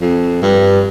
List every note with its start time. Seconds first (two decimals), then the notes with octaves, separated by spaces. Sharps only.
0.01 F2
0.42 G2